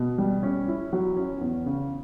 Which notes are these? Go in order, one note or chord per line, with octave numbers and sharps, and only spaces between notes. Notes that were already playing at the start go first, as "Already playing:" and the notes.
Already playing: B2
G3
C#4
E4
F#3
C#4
E2
C#3